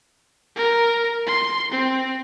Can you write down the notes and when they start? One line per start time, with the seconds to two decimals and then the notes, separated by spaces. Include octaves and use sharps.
0.56 A#4
1.26 C6
1.71 C4